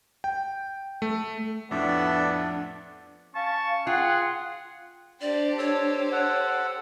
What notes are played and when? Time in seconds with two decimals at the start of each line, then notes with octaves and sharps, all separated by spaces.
0.24 G5
1.02 A3
1.71 F2 A2 B3 D4 A4 D5 E5
3.35 C#4 F5 A5 C#6
3.87 F4 G#4 F#5 G5
5.21 D4 G4 C5 D5
5.58 A4 C#5
6.12 A4 F#5